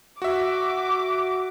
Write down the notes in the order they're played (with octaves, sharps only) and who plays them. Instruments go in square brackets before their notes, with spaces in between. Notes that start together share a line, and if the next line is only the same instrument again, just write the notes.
[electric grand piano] F#4 E5 [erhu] D6